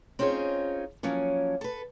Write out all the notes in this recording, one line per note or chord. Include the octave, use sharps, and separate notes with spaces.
C4 C#4 D#4 F4 G#4 C#5
F3 F#3 A#3 C#4
A4 B4